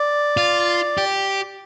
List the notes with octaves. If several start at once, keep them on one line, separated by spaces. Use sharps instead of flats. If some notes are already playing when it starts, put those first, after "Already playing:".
Already playing: D5
F4
G4